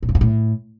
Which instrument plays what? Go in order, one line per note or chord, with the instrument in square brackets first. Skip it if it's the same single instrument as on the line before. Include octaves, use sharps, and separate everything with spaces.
[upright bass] A#2
F2
G2
A2